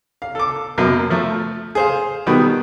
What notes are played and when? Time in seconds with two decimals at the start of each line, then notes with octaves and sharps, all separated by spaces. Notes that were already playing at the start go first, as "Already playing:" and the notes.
0.22 F5
0.35 A4 D6
0.78 F#2 B2 A#3
1.10 F3 A3
1.75 G#4 C5 F5
2.26 B2 D#3 G3 B3